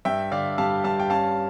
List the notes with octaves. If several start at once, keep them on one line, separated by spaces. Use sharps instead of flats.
G2 E5 G5
D3 D5 F5
G3 F5 A5
G2 F5 A5
G5
C#4 F5 A5